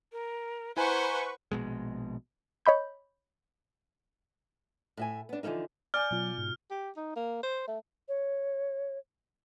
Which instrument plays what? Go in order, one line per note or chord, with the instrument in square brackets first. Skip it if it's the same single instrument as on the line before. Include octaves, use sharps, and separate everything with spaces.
[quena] A#4
[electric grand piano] E4 G#5 [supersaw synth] B4 C#6 [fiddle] C5 F#5 [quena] A#5
[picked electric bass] A#1 B2 G#3
[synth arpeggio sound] C#5 D#5 B5 G6
[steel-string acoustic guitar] A2 E5 G#5
B3 D4
D3 E3 F3 A#3 D#4
[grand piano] D5 G#5 G6 [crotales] F6
[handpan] B2 F4 [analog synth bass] F#3
[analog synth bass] G#2
[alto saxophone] G4
D#4
A#3
C5
A3
[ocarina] C#5